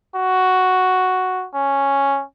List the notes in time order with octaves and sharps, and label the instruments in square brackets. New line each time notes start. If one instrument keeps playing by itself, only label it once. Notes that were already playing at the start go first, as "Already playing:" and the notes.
[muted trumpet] F#4
C#4